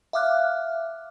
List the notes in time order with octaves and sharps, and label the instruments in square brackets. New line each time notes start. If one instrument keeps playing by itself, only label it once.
[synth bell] E5 F5 D6 F6 F#6